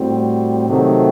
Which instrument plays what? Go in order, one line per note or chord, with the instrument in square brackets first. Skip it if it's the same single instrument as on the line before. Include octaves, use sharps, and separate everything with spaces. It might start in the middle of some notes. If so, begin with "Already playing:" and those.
Already playing: [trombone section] A2 G3 C4 F#4
C3 D#3 F#3 A3